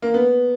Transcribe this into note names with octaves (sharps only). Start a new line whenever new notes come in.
A#3
B3